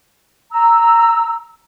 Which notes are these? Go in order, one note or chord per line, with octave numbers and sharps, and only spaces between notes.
A#5 E6